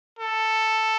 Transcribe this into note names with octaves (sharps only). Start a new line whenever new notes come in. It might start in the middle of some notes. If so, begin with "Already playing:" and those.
A4